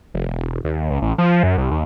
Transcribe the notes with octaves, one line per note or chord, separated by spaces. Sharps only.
F1
E1
D#2
C#2
A1
F3
F#2
C2
D#2